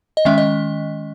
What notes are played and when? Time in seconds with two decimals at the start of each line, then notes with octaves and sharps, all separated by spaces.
0.17 D#5
0.25 D#3 G#3 C#4 E5
0.38 D#5